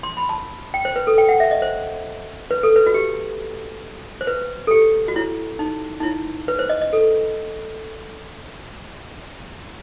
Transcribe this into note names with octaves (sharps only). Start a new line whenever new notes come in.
C6
B5
A5
G5
C5
B4
A4
G5
F#5
E5
D#5
C5
B4
A4
B4
F#4
G4
C5
B4
A4
G4
F#4
E4
D#4
D#4
E4
B4
C5
D#5
D#5
A4